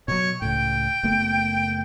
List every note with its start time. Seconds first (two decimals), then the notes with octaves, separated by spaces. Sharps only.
0.08 B2 F#3 C#5
0.42 C#2 A2 G5
1.03 F#1 A3 B3